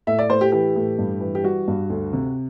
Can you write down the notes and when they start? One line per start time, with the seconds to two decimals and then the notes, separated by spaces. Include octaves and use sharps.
0.07 A2 E5
0.19 D5
0.29 A2 C5
0.41 G4
0.52 E3 G4
0.76 A2
0.98 G2
1.21 E3
1.35 G4
1.44 G3 F#4
1.68 G2
1.90 D2
2.13 C3